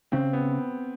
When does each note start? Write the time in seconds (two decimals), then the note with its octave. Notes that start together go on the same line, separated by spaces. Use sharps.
0.12 C#3 C4
0.33 B3